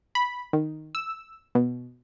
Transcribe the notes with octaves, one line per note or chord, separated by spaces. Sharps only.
B5
D#3
E6
B2